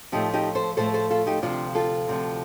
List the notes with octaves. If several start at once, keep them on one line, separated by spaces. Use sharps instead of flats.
A2 F3 A3 D#4 G4
D#4 G4
A4 C5
A2 F3 A3 A4 C5
A4 C5
F4 A4
D#4 G4
D2 C3 F3 D4 F4
F4 A4
D2 C3 F3